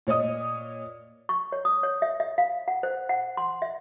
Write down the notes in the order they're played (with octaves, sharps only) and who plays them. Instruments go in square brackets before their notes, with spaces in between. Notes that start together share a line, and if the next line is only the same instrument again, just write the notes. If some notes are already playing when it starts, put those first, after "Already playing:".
[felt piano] A#2 C#5 D#5 D#6
[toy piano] C#6
C#5
D#6
C#5
E5
E5
F5
F#5
C5
F#5
C6
E5